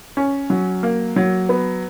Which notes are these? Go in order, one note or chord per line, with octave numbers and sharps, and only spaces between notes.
C#4
F#3
A#3
F#3
B3